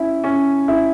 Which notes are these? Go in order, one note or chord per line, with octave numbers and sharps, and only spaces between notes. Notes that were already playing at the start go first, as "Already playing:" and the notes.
Already playing: C#4 E4
C#4
E4